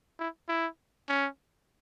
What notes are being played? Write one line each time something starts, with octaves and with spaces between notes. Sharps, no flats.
E4
E4
C#4